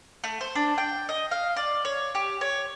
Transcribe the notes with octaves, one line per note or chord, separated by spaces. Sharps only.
A3
C5
D4
G5
D#5
F5
D5
C#5
G4
C#5